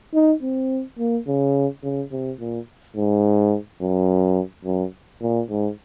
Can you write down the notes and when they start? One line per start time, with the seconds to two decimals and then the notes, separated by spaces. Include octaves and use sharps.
0.14 D#4
0.43 C4
0.99 A#3
1.27 C#3
1.83 C#3
2.12 C3
2.40 A#2
2.96 G#2
3.81 F#2
4.65 F#2
5.22 A#2
5.49 G#2